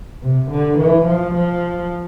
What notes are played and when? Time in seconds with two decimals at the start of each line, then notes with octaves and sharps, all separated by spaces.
0.22 C3
0.50 D3
0.77 E3
1.05 F3
1.34 F3